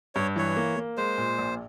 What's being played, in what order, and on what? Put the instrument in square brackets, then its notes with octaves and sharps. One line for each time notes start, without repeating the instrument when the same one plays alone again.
[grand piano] G2 [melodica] C#5
[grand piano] E3 [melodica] C#5
[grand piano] A#3
A#3
[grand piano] G#3 [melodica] C5
[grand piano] A#2
A#1